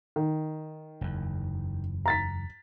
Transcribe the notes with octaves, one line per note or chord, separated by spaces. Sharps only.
D#3
F#1 E2
A#5 A6 B6